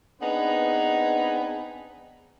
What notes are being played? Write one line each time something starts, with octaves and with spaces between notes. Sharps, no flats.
B3 C4 D4 D#4 G#4 B4